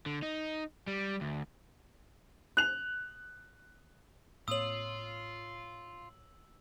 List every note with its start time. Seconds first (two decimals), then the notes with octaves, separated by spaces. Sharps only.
0.06 D3
0.23 D#4
0.87 G3
1.21 D2
2.57 F#6 F7
4.48 A2 A#3 C4 F4 C#5 D#6 E6 F#7